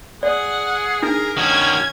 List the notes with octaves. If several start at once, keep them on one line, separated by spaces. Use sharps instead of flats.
G#4 D5 F#5
D4 D#4 G#4 A#4
D#3 C#4 F#4 G#6